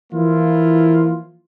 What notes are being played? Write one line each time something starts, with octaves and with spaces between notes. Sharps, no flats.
E3 F3 A#3 E4 F4